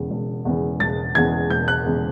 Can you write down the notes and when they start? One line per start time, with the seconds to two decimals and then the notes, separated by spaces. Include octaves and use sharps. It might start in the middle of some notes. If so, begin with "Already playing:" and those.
Already playing: E1 E2 C#3 E3
0.10 E1
0.45 E2 C#3 E3
0.80 E1 A6
1.15 E2 C#3 E3 G#6
1.50 E1 G6
1.68 F#6
1.85 E2 C#3 E3